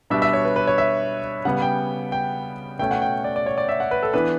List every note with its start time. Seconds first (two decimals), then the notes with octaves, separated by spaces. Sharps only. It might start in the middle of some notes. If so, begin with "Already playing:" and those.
0.10 B2 G3 D4 E5
0.22 E5
0.33 C#5
0.45 B4
0.56 B4
0.67 C#5
0.78 E5
1.45 C#3 G3 B3 F#5
1.62 G5
2.12 G5
2.79 B2 A3 C#4 G5
2.91 F#5
3.02 G5
3.24 D5
3.36 D5
3.46 C#5
3.58 D5
3.69 E5
3.80 F#5
3.91 B4
4.02 A4
4.13 E3 B3 D4 B4